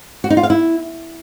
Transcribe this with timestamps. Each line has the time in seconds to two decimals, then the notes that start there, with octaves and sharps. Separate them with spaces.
0.24 F#4
0.30 D#4
0.37 F4
0.43 F5
0.50 E4